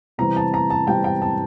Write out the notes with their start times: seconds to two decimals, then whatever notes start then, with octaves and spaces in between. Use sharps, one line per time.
0.18 C3 E3 G3 C4 A#5
0.36 A5
0.54 A#5
0.70 A5
0.87 C3 E3 G3 C4 G5
1.04 G5
1.22 A5